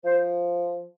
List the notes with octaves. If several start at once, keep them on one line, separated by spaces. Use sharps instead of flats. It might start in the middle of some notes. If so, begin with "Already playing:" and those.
F3 C5